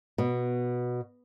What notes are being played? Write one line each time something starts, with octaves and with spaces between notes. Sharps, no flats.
B2